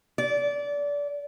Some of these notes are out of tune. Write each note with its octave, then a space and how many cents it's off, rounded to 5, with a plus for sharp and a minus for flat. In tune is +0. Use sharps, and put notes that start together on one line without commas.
D5 -25